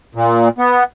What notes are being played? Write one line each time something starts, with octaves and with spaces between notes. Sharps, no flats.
A#2
B3